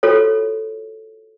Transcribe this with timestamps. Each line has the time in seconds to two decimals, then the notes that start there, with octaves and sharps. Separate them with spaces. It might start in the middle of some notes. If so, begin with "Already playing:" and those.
0.03 F4 F#4 A4 C#5